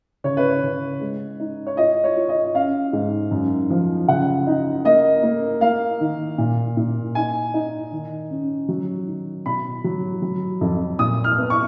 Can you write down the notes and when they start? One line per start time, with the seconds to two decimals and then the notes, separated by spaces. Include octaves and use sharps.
0.24 C#3 C#5
0.37 B4
0.50 C#5
0.63 C#3
1.01 G#3
1.40 D#4
1.67 C#5
1.77 F4 D#5
2.04 C#5
2.17 F4
2.29 D#5
2.55 C#4 F5
2.93 G#2
3.31 F#2
3.70 F3
4.08 C#3 F#5
4.47 D#4
4.85 A#3 D#5
5.23 A#3
5.61 A#3 F5
6.00 D#3
6.38 A#2
6.77 A#2
7.15 D#4 G#5
7.54 D#4
7.92 D#3
8.30 C#4
8.69 F#3
9.07 D#3
9.46 B2 B5
9.84 F#3
10.22 F#3
10.61 F2
10.99 A#2 D#6
11.24 F6
11.38 B3
11.50 C#6